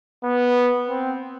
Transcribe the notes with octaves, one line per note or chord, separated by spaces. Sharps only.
B3
C4